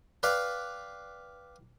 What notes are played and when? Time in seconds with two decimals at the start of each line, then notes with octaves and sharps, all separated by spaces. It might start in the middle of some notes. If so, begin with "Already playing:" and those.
0.23 B4 D5 F5 G5